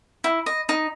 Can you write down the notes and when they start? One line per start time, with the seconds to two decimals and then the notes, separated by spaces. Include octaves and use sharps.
0.24 E4
0.46 D#5
0.69 D#4